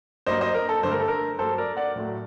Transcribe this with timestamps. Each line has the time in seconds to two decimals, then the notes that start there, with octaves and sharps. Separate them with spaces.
0.26 G2 F#3 A#3 C5 D#5
0.41 C5 D#5
0.54 A#4
0.69 A4
0.83 G2 D3 A3 C5
0.92 A#4
1.00 A4
1.08 A#4
1.39 G2 F#3 A#3 A4 C5
1.58 A#4 D5
1.77 D5 F#5
1.96 A2 F#3 A3